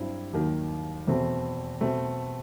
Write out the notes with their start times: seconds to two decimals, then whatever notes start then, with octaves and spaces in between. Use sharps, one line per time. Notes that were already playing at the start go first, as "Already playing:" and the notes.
Already playing: G2 F#3 C4 E4
0.33 D#2 D#3 F#3
1.07 E2 B2 A3 C4
1.81 B2 A3 C4